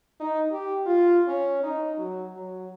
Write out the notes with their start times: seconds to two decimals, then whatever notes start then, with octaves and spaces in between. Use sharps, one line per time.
0.20 D#4
0.52 G4
0.86 F4
1.27 C#4
1.63 D#4
1.98 F#3
2.33 F#3